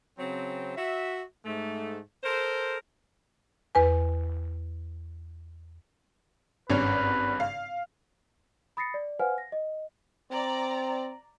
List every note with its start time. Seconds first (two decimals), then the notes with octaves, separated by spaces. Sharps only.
0.18 C#3 F#3 C4
0.76 F#4 E5
1.45 G#2 A3
2.23 A4 A#4 C5
3.75 E2 B4 G#5
6.70 G#1 G2 C#4 B4
7.40 F5
8.77 B5 D#6 A6 A#6 C7 C#7
8.94 D5
9.19 B4 C5 F5 F#5 G#5 F6
9.38 A#6
9.52 D#5
10.32 C4 D5 A#5